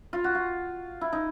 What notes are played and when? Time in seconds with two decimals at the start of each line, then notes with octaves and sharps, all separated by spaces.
0.13 F4
0.24 F#4
0.35 F4
1.01 E4
1.13 D#4